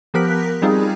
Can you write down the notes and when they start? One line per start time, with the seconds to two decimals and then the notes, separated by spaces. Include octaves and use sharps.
0.14 F3 B3 G4 A#4 F#6 B6
0.62 G3 C4 D#4 F4 G#4